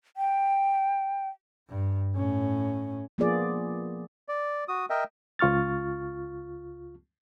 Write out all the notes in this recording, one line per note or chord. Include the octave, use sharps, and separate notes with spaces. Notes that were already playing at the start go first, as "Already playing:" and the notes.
G5
G2
A2 C#4
F3 A#3 B3 F4 G#4 D5
D5
F#4 D#6
A#4 D#5 E5 G5
C#2 F4 C#6 F6 A6